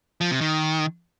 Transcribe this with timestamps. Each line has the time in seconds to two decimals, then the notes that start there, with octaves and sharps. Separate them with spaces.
0.21 F3
0.31 C3
0.41 D#3